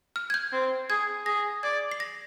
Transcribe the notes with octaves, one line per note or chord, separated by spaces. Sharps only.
F6
G#6
G6
C4
G#4 G#6
G#4 A#6
D5 G#6
C7
A#6